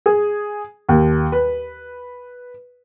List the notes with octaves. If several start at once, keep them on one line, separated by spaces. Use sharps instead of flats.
G#4
D#2
B4